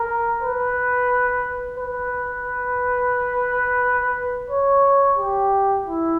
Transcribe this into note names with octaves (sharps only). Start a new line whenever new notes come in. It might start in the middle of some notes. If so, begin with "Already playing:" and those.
Already playing: A#4
B4
B4
C#5
G4
E4